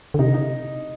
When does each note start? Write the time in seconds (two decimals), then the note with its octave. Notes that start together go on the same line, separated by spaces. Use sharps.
0.14 D3
0.19 C3 D#4
0.34 D#4